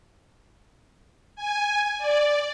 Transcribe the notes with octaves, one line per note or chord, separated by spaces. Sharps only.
G#5
D5